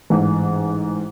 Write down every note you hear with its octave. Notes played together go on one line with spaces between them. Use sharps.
A1 G#2